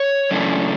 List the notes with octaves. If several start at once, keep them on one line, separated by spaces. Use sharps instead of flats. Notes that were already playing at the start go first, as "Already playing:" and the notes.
Already playing: C#5
F#2 C#3 E3 A3 D4